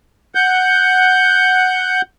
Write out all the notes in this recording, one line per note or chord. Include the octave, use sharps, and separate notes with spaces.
F#5 G6